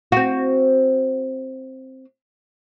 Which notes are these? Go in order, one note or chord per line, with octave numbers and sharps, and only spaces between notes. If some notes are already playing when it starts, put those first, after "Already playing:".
C4 F#4